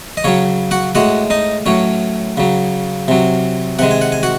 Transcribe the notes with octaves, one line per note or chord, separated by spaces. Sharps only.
D#5
C#3 F#3 C#4 C#5
F#4 F#5
A2 G#3 F#4 F#5
D#4 D#5
A2 F#3 C#4 C#5
C#3 F#3
C3 F#3
C3 D#3 G#3 F#5
G#5
F#5
G#5
F#4 F#5